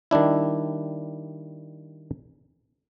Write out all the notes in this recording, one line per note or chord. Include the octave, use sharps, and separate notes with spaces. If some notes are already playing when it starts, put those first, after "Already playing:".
D#3 G3 D4 E4